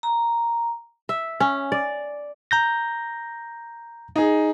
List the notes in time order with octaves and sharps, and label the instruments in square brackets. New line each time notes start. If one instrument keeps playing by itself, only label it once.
[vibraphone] A#5
[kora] E5
C#4
D5
[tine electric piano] A#5 G6 A#6
[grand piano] D#4 G#4